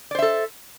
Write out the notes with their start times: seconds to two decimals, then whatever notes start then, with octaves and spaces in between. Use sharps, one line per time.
0.11 D5
0.15 C5
0.19 E5
0.22 A4